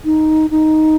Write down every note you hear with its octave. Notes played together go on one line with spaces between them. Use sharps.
D#4
D#4